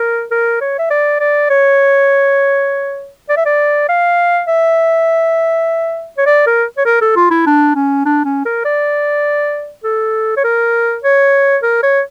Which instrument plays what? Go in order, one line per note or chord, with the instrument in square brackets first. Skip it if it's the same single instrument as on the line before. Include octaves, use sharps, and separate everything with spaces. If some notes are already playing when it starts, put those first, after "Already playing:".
Already playing: [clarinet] A#4
A#4
C#5
E5
D5
D5
C#5
D5
E5
D5
F5
E5
C#5
D5
A#4
C#5
A#4
A4
F4
E4
D4
C#4
D4
C#4
A#4
D5
A4
C#5
A#4
C#5
A#4
C#5